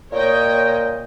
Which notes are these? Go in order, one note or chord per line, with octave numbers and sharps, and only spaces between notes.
A#2 C#5 D#5 G5